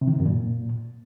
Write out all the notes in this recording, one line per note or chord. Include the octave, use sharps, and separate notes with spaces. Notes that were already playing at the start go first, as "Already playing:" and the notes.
C3
D#3
C3
F#2
A#2